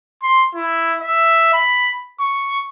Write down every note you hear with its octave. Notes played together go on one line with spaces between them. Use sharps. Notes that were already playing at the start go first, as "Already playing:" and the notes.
C6
E4
E5
B5
C#6